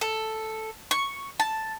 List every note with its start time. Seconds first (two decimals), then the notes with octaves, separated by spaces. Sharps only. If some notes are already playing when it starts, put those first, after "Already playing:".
0.01 A4
0.91 C#6
1.40 A5